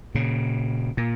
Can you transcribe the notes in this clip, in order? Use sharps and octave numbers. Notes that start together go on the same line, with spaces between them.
A#2 C#3
A#2